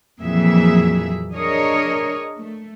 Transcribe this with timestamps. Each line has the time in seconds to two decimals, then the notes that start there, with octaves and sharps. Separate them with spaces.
0.21 F2 A#2 E3 F#3 G#4 E5
1.32 D4 G#4 A#4 C#5 D#5
2.37 A3